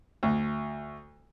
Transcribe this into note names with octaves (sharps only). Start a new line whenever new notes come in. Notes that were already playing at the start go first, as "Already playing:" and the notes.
D2